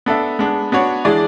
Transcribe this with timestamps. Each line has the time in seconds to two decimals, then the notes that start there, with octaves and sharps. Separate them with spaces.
0.06 B3 D4 A4 E5
0.39 G#3 B3 D4
0.72 B3 D4 F#4 C#5
1.05 E3 G#3 D4 G#4 D5